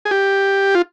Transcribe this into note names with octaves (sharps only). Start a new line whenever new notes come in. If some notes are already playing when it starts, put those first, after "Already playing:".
G#4
G4
F4